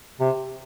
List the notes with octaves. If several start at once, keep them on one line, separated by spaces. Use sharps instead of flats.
C3